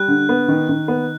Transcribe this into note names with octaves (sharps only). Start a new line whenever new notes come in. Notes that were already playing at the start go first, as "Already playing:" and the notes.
Already playing: G3 F#6
D3
B3
D#3
D#3
B3